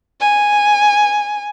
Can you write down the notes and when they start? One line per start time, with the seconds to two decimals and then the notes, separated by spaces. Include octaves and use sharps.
0.21 G#5